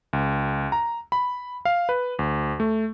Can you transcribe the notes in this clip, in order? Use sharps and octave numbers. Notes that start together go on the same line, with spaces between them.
C#2
A#5
B5
F5
B4
D2
A3